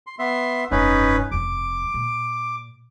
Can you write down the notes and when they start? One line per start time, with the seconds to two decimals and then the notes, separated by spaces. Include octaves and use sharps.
0.07 C6
0.19 B3 E5 C6
0.71 F1 G2 C#4 D#4 B4
1.31 F1 F2 D6
1.94 A#2